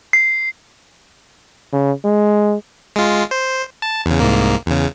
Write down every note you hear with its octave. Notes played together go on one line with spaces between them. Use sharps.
C7
C#3
G#3
G#3 F4
C5
A5
E2 C#3
C2 G#2 A#3
E2 C#3